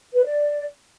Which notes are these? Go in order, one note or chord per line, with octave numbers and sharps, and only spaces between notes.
B4
D5